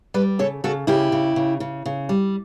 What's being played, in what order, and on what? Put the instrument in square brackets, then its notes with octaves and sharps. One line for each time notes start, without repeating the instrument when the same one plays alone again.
[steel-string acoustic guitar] G3 B4 D5
C#3 A4 C#5
C#3 F#4 A4
C#3 E4 G4
C#3
C#3
C#3
C#3
G3